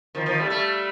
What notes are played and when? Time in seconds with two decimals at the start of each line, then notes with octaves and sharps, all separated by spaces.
0.15 D#3 F3
0.26 D#3 F3
0.38 G3 A3
0.50 G3 A3